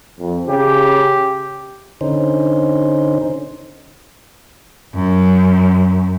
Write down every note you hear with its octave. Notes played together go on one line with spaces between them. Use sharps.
F2
C#3 G4
D3 C#4 D#4 C5
F#2